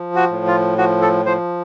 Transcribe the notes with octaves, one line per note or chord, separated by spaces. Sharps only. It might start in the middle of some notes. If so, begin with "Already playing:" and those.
Already playing: F3
F#4
A2
F4
F3 F#4
A4
F3 C5